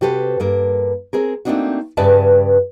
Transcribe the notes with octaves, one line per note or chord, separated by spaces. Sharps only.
C3 F#4 G4 A4 B4 C5
G2 A#3 A#4
C4 G#4 A#4
A3 A#3 C4 D4 D#4 F#4
G2 C#3 B4 D5 E5 A5